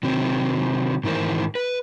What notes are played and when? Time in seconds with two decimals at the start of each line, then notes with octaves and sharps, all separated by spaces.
0.03 C3 D#3 F#3 C4
1.04 G#2 D#3 E3 A#4 C5
1.55 B4